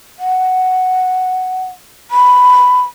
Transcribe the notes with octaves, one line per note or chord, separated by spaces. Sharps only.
F#5
B5